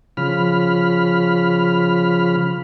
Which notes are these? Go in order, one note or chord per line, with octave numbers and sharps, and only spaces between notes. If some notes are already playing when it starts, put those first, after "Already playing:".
C#3 F3 B5 F6